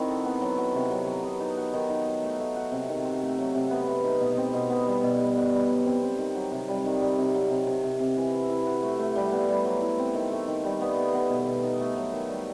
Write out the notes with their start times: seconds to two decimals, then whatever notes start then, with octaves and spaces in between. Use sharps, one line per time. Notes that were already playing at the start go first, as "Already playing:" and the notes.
Already playing: D#3 C4 E4 F#4
0.08 A4
0.25 B3
0.41 F#3
0.58 F#4
0.74 C3
0.91 F#3
1.07 F#3
1.23 B3
1.40 D#4
1.57 F#4
1.74 D#3
1.90 D#4
2.06 F#3
2.23 A3
2.39 A3
2.56 F#4
2.72 C3
2.89 D#3
3.05 C4
3.22 A3
3.38 F#3
3.55 C3
3.71 B3
3.87 B3
4.04 D#4
4.20 B2
4.37 C4
4.54 B2
4.70 B3
4.87 G3
5.03 B2
5.20 G3
5.36 B3
5.53 G3
5.69 F#3
5.86 C4
6.02 C4
6.19 D#3
6.35 F#3
6.52 C3
6.68 G3
6.85 D#3
7.01 G3
7.18 C3
7.34 F#3
7.51 C3
7.67 C3
7.84 C3
8.00 C3
8.17 E3
8.33 E4
8.50 E4
8.66 F#4
8.83 A3
8.99 A3
9.15 G3
9.32 B3
9.48 G3
9.65 F#3
9.82 E4
9.98 C4
10.14 D#3
10.31 A3
10.48 D#3
10.64 G3
10.81 B3
10.97 B3
11.14 B3
11.30 B2
11.47 B2
11.63 D#4
11.80 A3
11.96 F#3
12.13 D#3
12.29 G3